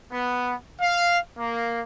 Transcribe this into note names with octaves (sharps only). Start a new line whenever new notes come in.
B3
F5
A#3